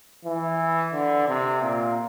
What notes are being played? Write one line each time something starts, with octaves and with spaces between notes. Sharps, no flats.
E3
D3
C3
A#2